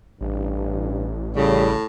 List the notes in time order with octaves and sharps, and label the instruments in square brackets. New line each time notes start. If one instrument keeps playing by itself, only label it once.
[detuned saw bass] A1 [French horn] G2
[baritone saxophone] A2 [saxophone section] C#3 [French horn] G3